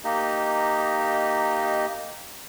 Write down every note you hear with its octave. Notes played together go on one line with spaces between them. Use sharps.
A#3 D#4 G4 D#5